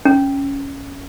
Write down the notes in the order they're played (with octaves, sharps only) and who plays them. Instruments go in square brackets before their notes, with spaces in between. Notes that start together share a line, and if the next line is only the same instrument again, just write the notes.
[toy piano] C#4